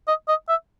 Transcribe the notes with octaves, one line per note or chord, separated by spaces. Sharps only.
D#5
D#5
E5